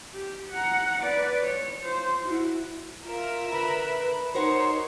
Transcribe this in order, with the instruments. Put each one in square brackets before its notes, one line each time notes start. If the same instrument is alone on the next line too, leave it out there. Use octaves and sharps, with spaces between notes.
[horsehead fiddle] G4
F#5 A#5
B4 D5
C#5
F4 C5
E4 F#4
[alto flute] F4 [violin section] A#4 E5
[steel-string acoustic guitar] D3 [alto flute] B4 [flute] B5
[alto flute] D#4 [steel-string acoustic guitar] F#4 A#4 C5 [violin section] C#5 [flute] C6